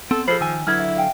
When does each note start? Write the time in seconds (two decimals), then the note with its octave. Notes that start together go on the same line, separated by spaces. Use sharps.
0.11 B3 C4 A4
0.28 F3 G#4 A4 C5 B5 C7
0.41 D#3 G#5 E6
0.67 D3 F#3 E4 B4 A5 F6 G#6
0.79 E5
0.96 F5 G5 G#5